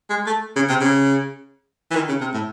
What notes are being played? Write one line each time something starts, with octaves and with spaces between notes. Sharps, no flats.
G#3
A3
C#3
C3
C#3
E3
D#3
C#3
C3
A2